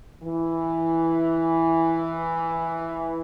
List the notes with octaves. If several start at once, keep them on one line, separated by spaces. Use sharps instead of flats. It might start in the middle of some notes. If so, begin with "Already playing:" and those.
E3